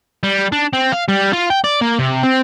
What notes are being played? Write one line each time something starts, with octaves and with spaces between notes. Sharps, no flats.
G3
D4
C4
F5
G3
F4
G5
D5
A#3
C3
C4